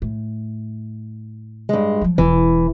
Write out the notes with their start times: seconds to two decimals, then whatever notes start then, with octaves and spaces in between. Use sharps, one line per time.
0.02 A2
1.69 G2 G#3
2.01 F3 F#3
2.18 E1 E3 E4